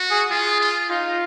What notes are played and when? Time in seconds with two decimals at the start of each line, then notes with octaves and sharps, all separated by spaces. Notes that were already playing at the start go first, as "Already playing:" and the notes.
Already playing: F#4
0.10 G#4
0.30 F4 G#4
0.60 F4
0.90 D#4 F4